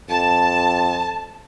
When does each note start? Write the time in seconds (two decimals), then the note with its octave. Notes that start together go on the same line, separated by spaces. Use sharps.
0.10 F2 A5